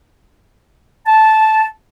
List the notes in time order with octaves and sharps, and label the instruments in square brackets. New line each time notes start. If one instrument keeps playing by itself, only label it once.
[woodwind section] A5